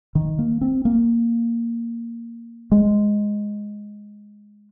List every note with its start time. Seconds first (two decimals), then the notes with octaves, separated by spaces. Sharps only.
0.15 D#3
0.39 A#3
0.61 C4
0.85 A#3
2.72 G#3